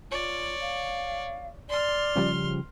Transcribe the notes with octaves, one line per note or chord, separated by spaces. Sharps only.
F4 C#5 D5
F5
D5 C6 F6
C#3 F3 G3